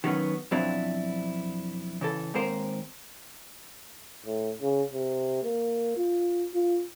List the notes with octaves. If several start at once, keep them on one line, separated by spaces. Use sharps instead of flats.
D#3 F#3 G3 B3 C#4
F2 B2 F#3 C4 D4 E4
C#3 E3 A4
D#2 G#2 C4 A#4 C5
A2
C#3
C3
A#3
F4
F4